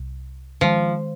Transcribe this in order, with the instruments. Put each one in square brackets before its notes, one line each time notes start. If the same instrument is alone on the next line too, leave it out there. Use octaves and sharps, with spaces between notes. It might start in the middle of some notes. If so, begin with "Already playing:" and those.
Already playing: [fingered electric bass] C2
[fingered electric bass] D#3 G#3 [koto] F3